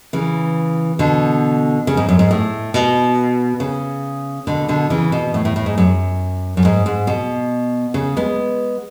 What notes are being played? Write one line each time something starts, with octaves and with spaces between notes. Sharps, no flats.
C#3 E3
B2 D3
C#3
G#2
F#2
G#2
A2
B2
C#3
B2 D3
B2 D3
C#3 E3
B2
A2
A2
A2
G#2
F#2
F#2
G#2
G#2
B2
C#3
G#3 B3